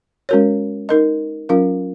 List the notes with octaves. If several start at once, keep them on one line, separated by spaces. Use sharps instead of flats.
G#3 C#4 F#4 A#4 C#5
D#4 A#4 D#5
F#3 C#4 F4 A#4 F5